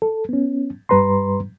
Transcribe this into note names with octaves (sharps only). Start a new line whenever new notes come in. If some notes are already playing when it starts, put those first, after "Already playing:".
A4
B3 C#4
G2 G3 B4 A#5 C6